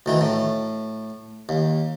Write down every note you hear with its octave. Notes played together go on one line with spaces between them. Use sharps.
D2 D#3 E3
A2
D#2